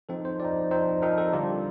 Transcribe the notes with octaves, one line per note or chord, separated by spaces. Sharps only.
F3 C4 D#4 A4
C5
F3 C4 D#4 D5
F3 C4 D#4 C5
F3 C4 D#4 A#4
A4
D3 G3 D4 F4 G4